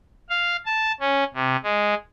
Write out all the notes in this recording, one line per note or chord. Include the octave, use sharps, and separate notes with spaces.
F5
A5
C#4
C3
G#3